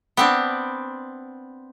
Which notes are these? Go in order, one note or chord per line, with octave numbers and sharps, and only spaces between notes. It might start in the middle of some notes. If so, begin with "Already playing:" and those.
B3 C4 D4